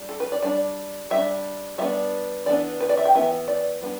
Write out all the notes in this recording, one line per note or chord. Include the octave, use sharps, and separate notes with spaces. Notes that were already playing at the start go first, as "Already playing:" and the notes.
Already playing: G3 D4
A4
B4
D5
G3 D4 D5
G3 D4 E5
G3 B3 D4 E5
E3 B3 D4 D5
B4
D5
E5
G5
E3 B3 D4 E5
D5
G3 B3 D4